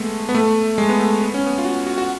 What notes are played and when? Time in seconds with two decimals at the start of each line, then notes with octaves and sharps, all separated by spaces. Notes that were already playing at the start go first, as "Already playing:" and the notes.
Already playing: G#3 A3 B3
0.29 B3
0.35 A3
0.78 G#3
0.89 B3
1.00 A3
1.22 B3
1.34 C#4
1.46 B3
1.58 F4
1.65 F#4
1.87 F#4
1.98 F#4